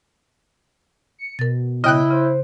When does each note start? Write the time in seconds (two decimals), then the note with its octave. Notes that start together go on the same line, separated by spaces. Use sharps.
1.19 C#7
1.39 B2 A#4 A6
1.84 C#3 E4 D#5 G5 F#6
2.10 C#3 C5